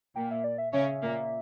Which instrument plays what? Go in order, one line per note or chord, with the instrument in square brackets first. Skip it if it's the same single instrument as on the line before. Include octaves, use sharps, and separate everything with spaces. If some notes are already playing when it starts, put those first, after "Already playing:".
[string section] A#2 A#3 [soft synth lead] G5
[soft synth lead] E5
D5
E5
[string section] C#3 C#4 [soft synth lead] E5
[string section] A#2 A#3